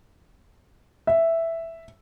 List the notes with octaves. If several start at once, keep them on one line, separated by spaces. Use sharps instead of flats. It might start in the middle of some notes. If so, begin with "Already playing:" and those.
E5